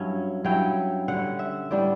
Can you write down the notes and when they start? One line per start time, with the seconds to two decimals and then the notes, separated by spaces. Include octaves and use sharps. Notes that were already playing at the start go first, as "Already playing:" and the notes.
Already playing: G2 F#3 C#4 E4
0.44 G2 F#3 C#4 E4 G5
1.08 D3 G3 C#4 F#5
1.39 E5
1.71 A2 G3 B3 D4 D5